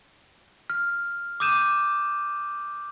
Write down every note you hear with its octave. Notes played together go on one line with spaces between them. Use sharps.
F6
D6 D#6 G6 D#7 E7